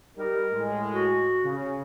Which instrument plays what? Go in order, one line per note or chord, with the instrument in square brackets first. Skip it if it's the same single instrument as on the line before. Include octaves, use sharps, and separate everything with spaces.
[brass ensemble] G3 D#4 [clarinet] A#4
[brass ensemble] A2 G#3
[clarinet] F#4
[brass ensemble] C#3